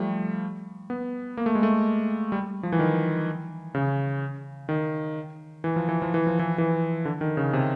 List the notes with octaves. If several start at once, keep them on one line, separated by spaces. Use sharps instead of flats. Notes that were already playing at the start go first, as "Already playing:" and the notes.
Already playing: F3 G3 A3
B3
A#3
A3
G#3
A3
G3
F3
E3
D#3
C#3
D#3
E3
F3
E3
F3
E3
F3
E3
E3
D3
D#3
C#3
C3